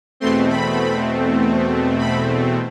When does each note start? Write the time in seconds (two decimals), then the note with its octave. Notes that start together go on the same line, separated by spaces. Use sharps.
0.20 E2 B2 A3 C4 C6
0.50 B5
1.99 B5